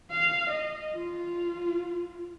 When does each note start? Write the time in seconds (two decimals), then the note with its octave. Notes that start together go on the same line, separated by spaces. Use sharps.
0.11 F5
0.50 D#5
0.95 F4